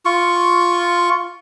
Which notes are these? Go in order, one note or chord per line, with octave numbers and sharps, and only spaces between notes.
F4 C#6